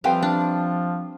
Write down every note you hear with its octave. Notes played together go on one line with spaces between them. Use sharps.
F3 G3 C4 B4 E5 F5 G5
D4